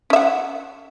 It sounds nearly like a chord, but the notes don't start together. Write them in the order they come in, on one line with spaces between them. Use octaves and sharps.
C#4 E5 F#5